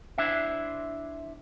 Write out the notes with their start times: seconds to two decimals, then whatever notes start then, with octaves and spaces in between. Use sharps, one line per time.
0.18 D4 E4 C5 E5